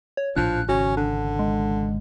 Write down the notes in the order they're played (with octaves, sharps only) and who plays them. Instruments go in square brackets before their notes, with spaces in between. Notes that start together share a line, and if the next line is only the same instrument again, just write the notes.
[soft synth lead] C#5
[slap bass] A#1 A2 D4 [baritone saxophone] F3 [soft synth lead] F#6
[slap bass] G#1 C#3 [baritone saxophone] C#4 [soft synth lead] F#4
[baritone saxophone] D3 [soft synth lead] D4
[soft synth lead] G#3